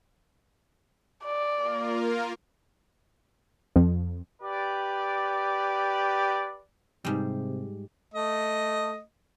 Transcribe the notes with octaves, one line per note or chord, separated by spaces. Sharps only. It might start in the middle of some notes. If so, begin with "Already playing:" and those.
D5
A#3 F4 A#4
F2
G4 B4 D5
G#2 C3 G3
A3 D#5